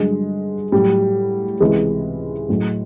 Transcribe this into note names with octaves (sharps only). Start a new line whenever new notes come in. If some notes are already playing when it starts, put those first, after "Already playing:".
Already playing: G2 D3 F#3 G#3
A2 F#3 G3
C#2 C3 E3 G#3
A2 F#3